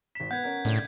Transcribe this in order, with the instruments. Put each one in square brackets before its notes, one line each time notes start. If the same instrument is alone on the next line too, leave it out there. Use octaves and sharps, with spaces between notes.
[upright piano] G#1 E7 [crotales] B6
[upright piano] B3 B4 [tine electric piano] F#5 [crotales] G6 G#6
[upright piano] C#4 A#4
[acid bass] A2 [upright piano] C#3 A3 D4